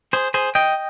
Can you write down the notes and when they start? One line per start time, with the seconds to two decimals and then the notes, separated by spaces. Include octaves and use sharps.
0.13 G#4 C5
0.34 G#4 C5
0.55 D#5 G5